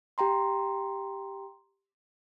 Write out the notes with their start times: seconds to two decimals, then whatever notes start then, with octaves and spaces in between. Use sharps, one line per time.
0.18 G4 G5 A#5 C6